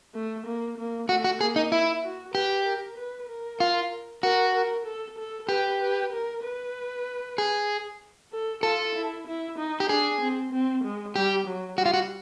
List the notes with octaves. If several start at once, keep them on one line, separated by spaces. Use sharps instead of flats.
A3
A#3
A#3
A3 F#4
F#4
A#3 G#4
D#4
E4
F#4
G4 B4
A#4
B4
A#4
F4
F#4 A#4
A#4
A4
A4
G4 B4
B4
A#4
B4
G#4
A4
F4 A4
E4
E4
D#4
G4
D4 G#4
C4
C4
G#3
G3 G4
F#3
G3 F#4
F4
F#4